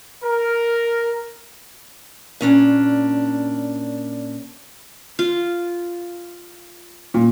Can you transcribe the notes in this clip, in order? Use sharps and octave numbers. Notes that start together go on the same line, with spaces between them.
A#4
A#2 C#4 D4
F4
A#2